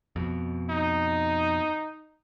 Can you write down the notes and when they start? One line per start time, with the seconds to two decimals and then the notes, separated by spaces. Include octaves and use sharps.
0.16 F2 B2
0.70 D#4